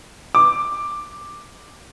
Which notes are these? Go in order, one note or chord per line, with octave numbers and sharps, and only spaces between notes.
D6